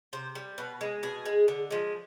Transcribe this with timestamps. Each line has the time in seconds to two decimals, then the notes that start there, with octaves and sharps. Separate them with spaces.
0.13 C3 C5
0.35 G3
0.58 B2 B4
0.81 G#3
1.03 B2 G#4
1.26 G#3
1.48 D3
1.71 F3 G#3